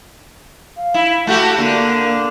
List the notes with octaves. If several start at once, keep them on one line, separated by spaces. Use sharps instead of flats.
F5
E4
A3 F#4 G4 F#5
D3 A#3